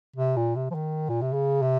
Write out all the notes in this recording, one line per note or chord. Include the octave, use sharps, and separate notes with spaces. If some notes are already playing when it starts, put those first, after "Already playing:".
C3
A#2
C3
F3
D#3
A#2
C3
C#3
C3